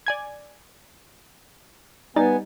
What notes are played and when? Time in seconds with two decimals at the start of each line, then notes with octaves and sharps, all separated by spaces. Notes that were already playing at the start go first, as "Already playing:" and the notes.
0.06 D5 G#5 G#6
2.16 G3 B3 D#4 G#5 A6